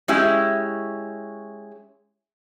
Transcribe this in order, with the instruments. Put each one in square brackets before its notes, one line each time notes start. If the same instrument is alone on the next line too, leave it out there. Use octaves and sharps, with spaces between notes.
[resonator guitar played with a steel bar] G#3 C#4 E4 G4